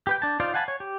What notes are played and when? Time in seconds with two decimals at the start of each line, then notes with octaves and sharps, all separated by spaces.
0.07 G4 B4 G5
0.22 D4 A5
0.40 D#4 F4 C5 D5 F5
0.54 F5 F#5 G#5 A5 B5
0.68 C#5
0.80 G4